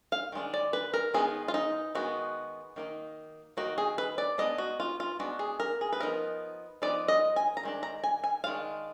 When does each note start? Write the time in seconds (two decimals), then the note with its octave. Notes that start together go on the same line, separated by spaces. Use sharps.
0.12 F5
0.32 D#3 G#3 D4
0.54 D5
0.73 B4
0.94 A#4
1.14 D#3 G#3 B3 D#4 G#4
1.48 F4
1.54 D#4
1.95 D#3 G#3 B3 D#4 F#4
2.76 D#3 A#3 D#4
3.57 D#3 A#3 D#4 F#4
3.78 G#4
3.98 B4
4.18 D5
4.38 G#3 B3 D4 D#5
4.58 F#4
4.80 F4
5.00 F4
5.19 G#3 B3 D4 F#4
5.39 G#4
5.60 A#4
5.81 G#4
5.93 B4
6.00 F3 B3 D#4 A#4
6.82 F3 B3 D#4 D5
7.08 D#5
7.36 G#5
7.57 A#5
7.63 D#3 G#3 D4
7.83 A#5
8.04 G#5
8.24 G#5
8.44 D#3 G#3 D4 F5